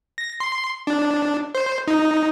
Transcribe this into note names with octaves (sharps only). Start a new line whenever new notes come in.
A#6
C6
D4
C5
D#4